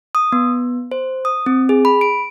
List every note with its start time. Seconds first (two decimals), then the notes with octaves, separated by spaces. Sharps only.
0.15 D#6
0.32 B3
0.92 C5
1.25 D#6
1.46 C4
1.69 G#4
1.85 B5
2.01 D7